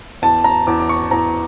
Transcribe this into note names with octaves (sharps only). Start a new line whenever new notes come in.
E2 A5
A#5
E2 D6
D6
C#6
E2 A#5